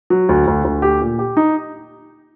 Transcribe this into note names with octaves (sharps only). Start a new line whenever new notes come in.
F#3
D2
D2
D2
G4
A#2
G4
D#4